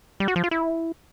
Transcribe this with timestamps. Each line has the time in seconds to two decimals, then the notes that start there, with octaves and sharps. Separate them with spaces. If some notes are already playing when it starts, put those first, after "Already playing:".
0.20 G3
0.28 F#4
0.36 F3
0.44 F4
0.51 E4